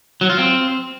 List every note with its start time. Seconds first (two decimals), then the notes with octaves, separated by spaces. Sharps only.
0.21 F#3
0.30 F4
0.38 C4